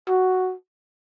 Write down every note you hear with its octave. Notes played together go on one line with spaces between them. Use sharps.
F#4